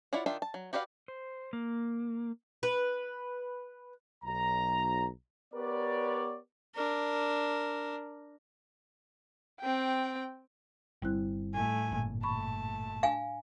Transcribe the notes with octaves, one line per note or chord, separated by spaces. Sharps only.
E4 F4 C#5 D5 F#5
D#3 D4 F4 E5 G5
A5
F#3
F#4 G4 B4 D5 F5
C5
A#3
B4
B1 A#5
B3 G4 A#4 B4 C#5 D5
D4 A#4
C4 G5
G1 G3 C4 E4 F#6
A2 A3 G#5
G1 A#2
A3 A5 B5 C#6
D4 F5 G#5